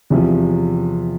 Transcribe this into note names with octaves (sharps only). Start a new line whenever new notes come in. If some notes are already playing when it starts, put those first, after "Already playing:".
E2 C3 F3